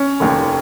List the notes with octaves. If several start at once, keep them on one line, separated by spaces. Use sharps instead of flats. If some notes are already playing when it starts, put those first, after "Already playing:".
Already playing: C#4
F1 D#2 D#3